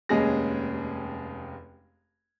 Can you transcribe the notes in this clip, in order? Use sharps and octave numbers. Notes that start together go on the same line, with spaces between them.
F1 D#2 G#3 C#4 G#4 A#6